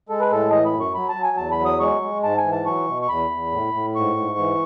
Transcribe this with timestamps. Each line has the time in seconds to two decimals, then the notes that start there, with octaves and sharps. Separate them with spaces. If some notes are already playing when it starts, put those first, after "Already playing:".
0.09 G#3 A4
0.20 B4
0.31 A2 A4
0.51 E3 D#5
0.66 B5
0.74 F#2
0.80 C#6
0.94 F#3 B5
1.09 A5
1.16 F#3
1.23 G#5
1.37 E2 A5
1.52 B5
1.59 F#3
1.65 D#6
1.80 G#3 C#6
2.02 G#3
2.23 G#2 A5
2.38 G#5
2.45 E3
2.52 A5
2.66 F#3 C#6
2.87 B2
3.02 C#6
3.09 E2 B5
3.31 E2
3.52 A2
3.74 A2
3.96 G#2 C#6
4.17 G#2
4.38 E3